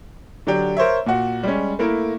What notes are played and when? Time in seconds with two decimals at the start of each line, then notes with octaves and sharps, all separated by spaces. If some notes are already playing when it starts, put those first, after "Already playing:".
0.47 D3 F#3 D4 G4
0.77 A#4 C5 C#5 E5
1.06 A#2 F#4
1.43 G3 G#3 C#4
1.79 A3 A#3 E4 A#4